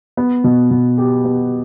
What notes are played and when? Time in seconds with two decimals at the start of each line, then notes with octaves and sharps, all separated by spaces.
0.17 B3
0.44 B2
0.71 B2
0.98 G4
1.25 B3